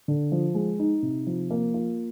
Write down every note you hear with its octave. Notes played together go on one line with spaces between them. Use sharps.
D3
F3
G#3
D#4
C3
F3
A#3
F4